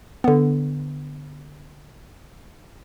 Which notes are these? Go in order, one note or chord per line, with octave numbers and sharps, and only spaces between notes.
D3 B3